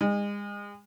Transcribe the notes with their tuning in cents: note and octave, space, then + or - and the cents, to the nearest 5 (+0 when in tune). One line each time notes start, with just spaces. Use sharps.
G#3 -30